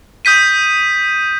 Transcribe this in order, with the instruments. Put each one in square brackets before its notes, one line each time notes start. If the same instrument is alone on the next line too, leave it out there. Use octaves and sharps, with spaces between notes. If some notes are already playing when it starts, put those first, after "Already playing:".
[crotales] D#6 G6 B6 D#7